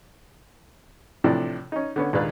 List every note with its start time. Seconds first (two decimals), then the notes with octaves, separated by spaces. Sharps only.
1.24 A2 C3 E3 F3 A3 D4
1.72 C#4 D#4
1.96 D3 B3 C#4
2.13 D#2 A#2 G#3 D4 B4 F5